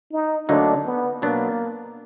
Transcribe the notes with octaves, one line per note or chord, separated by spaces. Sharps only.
D#4
D2 D3 F#3 A#3 D4 D#4
B3
B2 F#3 A#3 B3 D4